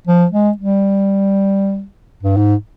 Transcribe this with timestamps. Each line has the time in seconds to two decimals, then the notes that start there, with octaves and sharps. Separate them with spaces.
0.08 F3
0.32 G#3
0.58 G3
2.23 G2
2.37 G#2